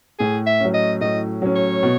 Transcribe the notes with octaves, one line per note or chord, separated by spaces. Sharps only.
A2 G#4
E5
F#3 C#4
D#5
A2 D#5
F#3 C#4
C#5
B2